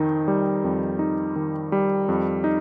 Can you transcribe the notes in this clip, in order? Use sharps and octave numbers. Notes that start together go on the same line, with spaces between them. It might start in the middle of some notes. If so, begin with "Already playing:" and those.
Already playing: F2 D#3 D#4
G3
F2
D#4
D#3
G3
F2
D#4